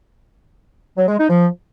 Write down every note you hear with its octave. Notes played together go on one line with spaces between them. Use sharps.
F#3
G#3
D#4
F3